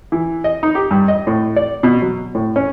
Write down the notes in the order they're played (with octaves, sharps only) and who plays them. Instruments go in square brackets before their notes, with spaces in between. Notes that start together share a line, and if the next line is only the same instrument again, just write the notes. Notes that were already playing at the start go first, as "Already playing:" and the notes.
[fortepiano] E3
D#5
D#4
G4
G2
D#5
A2
D5
B2
F#3
A2
C#4